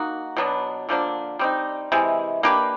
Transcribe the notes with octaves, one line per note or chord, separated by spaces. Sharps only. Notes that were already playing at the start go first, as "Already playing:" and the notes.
Already playing: A#3 D#4 F#4
B2 F#3 B3 D4
D3 F3 A#3 D4
G3 C4 D#4
C3 E3 G#3
A#3 D4 G4 B4